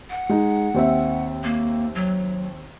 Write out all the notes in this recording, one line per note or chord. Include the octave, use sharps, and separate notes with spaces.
F#5
G#3 D#4
D#2 C4 E5
A#3
F#3